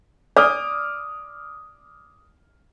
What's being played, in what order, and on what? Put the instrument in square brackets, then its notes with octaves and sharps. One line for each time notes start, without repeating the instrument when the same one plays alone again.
[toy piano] D5 [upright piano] D6 D#6 F6